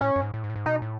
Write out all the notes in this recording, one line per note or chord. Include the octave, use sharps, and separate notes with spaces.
A2 C#4
F#2
G#2
A2
G#2
A2
G#2
B2 D#4
A2